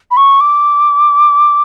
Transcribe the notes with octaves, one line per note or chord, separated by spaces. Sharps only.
B5
C#6
D6